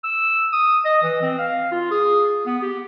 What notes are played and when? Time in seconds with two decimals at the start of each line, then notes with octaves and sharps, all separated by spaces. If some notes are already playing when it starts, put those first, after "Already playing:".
0.04 E6
0.53 D#6
0.85 D#5
1.03 E3
1.22 C4
1.39 F5
1.72 F4
1.91 G#4
2.46 B3
2.62 G4